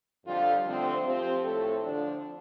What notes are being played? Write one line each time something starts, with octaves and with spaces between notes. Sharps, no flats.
F2 D3 G3 F4 A4
D3 F3 A3 C4
F3 C4 G4
A2 A3 C4 A4
D3 F3 D4